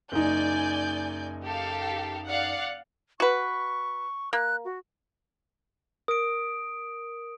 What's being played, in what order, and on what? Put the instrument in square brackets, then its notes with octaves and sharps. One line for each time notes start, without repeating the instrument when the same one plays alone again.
[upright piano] F#1 D#4 [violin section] D5 G#5 G6
[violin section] G4 A4 F5
D5 F5 F#5
[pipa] F#4 B4 [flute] C#6
[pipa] A#3 [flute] F#6
[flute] F#4
[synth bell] A#4 [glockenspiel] D#6 D7